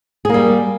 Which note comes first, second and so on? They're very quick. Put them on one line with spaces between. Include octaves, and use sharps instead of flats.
G#4 A#3 G3